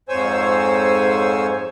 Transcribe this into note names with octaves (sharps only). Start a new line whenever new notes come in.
F2 G#2 C5 C#5 G#5 E6